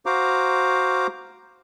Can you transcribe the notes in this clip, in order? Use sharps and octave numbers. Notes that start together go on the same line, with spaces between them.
F#4 C5 F5 A#5 D6